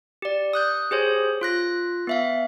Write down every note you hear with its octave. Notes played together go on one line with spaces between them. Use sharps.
G4 D5
D#6 F#6 G6
G4 G#4 C5 C#5
F4 F#6 A#6
B3 E5 F5